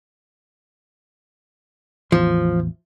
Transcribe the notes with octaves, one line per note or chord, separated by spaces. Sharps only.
A1 E2 F3